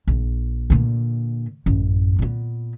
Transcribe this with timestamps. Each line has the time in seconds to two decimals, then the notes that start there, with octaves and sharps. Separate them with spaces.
0.07 A#1
0.70 A#2 D3
1.66 A1 F#2
2.19 A#2 B3